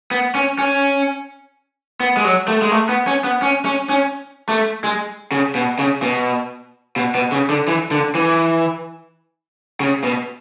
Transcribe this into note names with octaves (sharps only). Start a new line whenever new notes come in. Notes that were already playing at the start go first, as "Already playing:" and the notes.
B3
C#4
C#4
B3
G#3
F#3
A3
G#3
A3
B3
C#4
B3
C#4
C#4
C#4
A3
G#3
C#3
B2
C#3
B2
B2
B2
C#3
D3
E3
D3
E3
C#3
B2